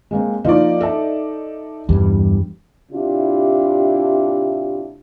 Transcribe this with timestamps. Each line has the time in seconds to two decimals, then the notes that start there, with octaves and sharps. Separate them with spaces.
0.11 G#3 A#3 C4
0.45 F3 A#3 D#4 F4 D5
0.81 A4 E5 A5
1.89 E2 G2 G3
2.92 A2 C3 D4 E4 F4 G4